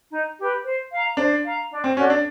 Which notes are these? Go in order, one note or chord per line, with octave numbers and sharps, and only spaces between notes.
D#4
G4 B4
C5
F5 A#5
D4 C5
F5 A#5
D4
C4
C#4 F#4 A4 D5
D4